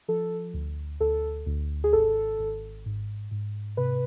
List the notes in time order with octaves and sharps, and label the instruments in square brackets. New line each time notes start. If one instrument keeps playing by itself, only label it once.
[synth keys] F3 A4
D2
D2 A4
D2
G#4
G#1 A4
G#1
G#2
G#2
C3 B4